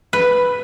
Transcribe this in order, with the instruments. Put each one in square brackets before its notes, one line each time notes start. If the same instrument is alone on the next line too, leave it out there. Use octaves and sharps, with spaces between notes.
[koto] B4